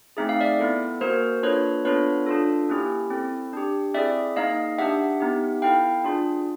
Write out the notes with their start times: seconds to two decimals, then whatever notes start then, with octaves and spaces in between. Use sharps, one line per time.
0.17 A3 C4 D#4 G#4 E5
0.29 F5
0.41 D5 E5
0.59 B3 E4 A4
1.01 A#3 C#4 F#4 A#4 C5
1.43 A#3 D4 F4 A4 B4 C#5
1.85 B3 D4 F4 A4 B4 C#5
2.27 D4 F4 A4
2.69 A#3 C#4 E4 G4
3.10 C4 E4 A4
3.53 D4 G4
3.94 C4 E4 G#4 D5 E5
4.36 A#3 D#4 G#4 D#5 F5
4.78 D4 G4 E5 F#5
5.20 B3 D#4 G4
5.62 B3 E4 A4 F5 G5
6.04 D4 F4 G#4